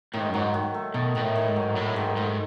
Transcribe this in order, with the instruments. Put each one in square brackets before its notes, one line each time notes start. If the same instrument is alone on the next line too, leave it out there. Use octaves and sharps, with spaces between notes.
[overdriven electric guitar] A2 [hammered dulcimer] D#3
[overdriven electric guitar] G#2
F#2
[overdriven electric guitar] G#2 [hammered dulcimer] F#3
[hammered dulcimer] D#3
A3
[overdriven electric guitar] B2 [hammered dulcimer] D#3
[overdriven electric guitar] B2 [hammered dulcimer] D#3
[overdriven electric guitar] A2
[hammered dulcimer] D#3
[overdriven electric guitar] G#2
[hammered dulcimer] F#3
[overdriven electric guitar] A2 [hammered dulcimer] A3
[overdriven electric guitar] G#2 [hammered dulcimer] D#3
[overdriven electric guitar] G#2 [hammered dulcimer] A3